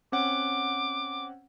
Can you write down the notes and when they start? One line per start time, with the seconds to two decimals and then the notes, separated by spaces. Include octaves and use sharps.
0.12 C4 C#4 F#5 D6